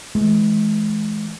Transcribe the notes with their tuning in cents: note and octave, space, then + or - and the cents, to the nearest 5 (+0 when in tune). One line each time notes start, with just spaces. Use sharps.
E3 +0 G#3 +35